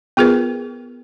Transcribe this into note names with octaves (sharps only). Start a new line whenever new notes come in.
B3 F4 G#4 A#4 B4